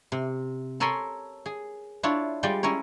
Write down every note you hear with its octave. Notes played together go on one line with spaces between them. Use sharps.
C3
A4 A#4 C#5 G#5 B5 C6
G#4
D4 E4 F4 C#5
G3 G#3 F4 D5 G5
C#4 E4 A#4 C#5